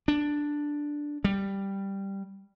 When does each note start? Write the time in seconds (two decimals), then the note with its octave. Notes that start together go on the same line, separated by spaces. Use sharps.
0.08 D4
1.24 G3